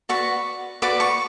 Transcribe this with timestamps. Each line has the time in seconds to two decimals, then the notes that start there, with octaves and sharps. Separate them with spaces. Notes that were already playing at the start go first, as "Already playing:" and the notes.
0.09 F#4 B4 D5 C#6
0.82 F#4 B4 D5 D6
1.00 C#6